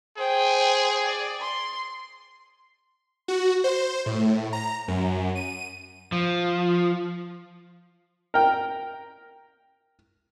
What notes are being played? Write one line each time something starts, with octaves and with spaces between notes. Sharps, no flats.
G#4 C5 G5
D5
C6
F#4
C5
A2
A#5
F#2
D#7
F3
A#4 G5